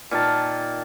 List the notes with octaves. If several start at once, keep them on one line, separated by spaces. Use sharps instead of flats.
A#2 D#3 A5